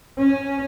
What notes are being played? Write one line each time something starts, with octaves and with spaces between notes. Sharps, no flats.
C#4